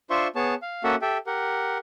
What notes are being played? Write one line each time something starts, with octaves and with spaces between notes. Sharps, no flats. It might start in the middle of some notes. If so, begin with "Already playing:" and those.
D4 F4 C5 E5 C6 C#6
B3 G#4 C#5 A5
F5
A#3 C#4 F#4 A4 E5 F#5
G4 A4 E5 G5
G4 A#4 F#5